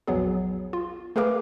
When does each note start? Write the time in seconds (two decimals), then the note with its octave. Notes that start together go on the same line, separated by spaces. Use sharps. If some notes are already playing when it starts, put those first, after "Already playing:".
0.07 A#1 E2 F#3 B3 G#4
0.73 F4
1.16 A3 G#4 A#4 B4 F5 D6